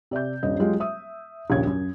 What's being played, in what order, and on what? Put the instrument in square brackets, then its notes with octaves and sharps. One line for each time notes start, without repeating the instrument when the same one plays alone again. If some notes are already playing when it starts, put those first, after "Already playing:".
[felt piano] C3 D5 E5 G6
D#1 G2 D#5
F#3 G#3 F4 G4 D#5
E5 D#6
A#1 D#2 C#3 C#5 G#6
F#2